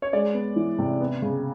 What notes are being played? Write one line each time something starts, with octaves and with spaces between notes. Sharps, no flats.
C#5
G#3 D5
B3
E3
C3
B3
C#3